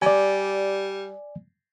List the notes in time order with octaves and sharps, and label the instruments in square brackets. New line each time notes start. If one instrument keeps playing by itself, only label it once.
[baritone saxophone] G3 [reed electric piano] D5 G#5